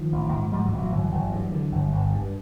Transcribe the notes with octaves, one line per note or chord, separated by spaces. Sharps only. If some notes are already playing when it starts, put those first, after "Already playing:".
Already playing: D#3 F3
A1
G#2
G#2 F3 G3
E3 F#3
A1
E3 F#3
G1 E3 F#3
G1
G2
D3
G1
G1
G2